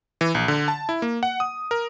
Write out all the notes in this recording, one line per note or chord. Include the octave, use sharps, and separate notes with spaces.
E3
A#1
D3
A5
E4
A#3
F#5
D#6
A#4